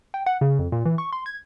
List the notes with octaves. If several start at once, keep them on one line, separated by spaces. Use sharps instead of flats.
G5
F#5
C#3
F2
A#2
E3
C#6
C6
G#6